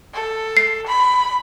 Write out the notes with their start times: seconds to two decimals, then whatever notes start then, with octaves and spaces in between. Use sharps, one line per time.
0.14 A4
0.57 C7
0.86 B5